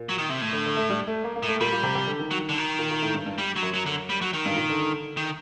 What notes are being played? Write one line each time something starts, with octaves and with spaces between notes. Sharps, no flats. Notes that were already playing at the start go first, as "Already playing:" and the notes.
Already playing: A#2
F#3
D#3
C3
A2
D3
D3
A3
G3
A3
A#3
A#3
A2
A3
A#2 G3
A#2
C3
C3
D3
D#3
F#3
D3
D#3
A#2
A#2
A2
G2
G2
G3
F#3
F#2
F#3
D3
G3
F#3
D#3
G2
A#2
D3
D#3